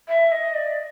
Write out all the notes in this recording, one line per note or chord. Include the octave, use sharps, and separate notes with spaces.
E5
D#5
D5